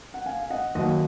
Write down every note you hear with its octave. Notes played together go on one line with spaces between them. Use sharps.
F#5
F5 G#5
F5
D#5 F#5
D#2 D#3 F#3 D#5 F#5